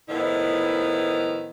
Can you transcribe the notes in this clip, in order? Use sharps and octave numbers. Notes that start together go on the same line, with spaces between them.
A2 D#3 F3 B3 E4